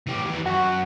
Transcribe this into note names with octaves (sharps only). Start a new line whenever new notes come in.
E3 G4
D#2 E3
F#2 F#4